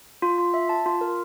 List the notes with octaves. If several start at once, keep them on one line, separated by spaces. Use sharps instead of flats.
F4
F4
E5
A5
F4
A#4